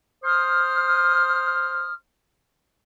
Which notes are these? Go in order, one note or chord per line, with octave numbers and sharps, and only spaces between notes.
C5 C6 D#6 F6